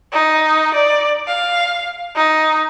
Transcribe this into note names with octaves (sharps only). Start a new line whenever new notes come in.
D#4
D5
F5
D#4